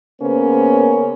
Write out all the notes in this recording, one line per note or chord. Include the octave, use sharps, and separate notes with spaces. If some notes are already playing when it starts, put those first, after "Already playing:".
C#3 A#3 B3 C#4 A#4 C5